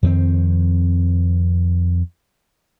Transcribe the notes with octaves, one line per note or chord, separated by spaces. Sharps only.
F2 D#3 B3 C4